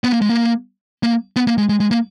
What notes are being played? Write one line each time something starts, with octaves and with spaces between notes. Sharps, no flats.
B3
A#3
G#3
A#3
A#3
B3
A#3
G#3
G#3
G#3
A#3